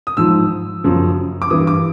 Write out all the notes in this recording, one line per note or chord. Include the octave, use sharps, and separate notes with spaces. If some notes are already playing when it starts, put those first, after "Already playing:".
D#6
G#2 F3 E6
F#2 C#3 F3
D6
G2 E3 D#6
D6